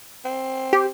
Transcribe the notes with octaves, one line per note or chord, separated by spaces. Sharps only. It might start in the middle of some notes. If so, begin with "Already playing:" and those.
C4
G4